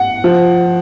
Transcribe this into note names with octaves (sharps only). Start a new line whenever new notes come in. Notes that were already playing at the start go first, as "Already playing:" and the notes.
Already playing: F#5
F3